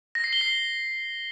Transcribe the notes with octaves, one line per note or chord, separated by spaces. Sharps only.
A#6
C7
G7
C7